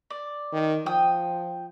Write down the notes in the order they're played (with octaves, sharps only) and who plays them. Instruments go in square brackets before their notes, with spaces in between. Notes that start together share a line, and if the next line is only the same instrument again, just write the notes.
[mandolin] D5
[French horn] D#3
[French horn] F3 [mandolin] G5 D#6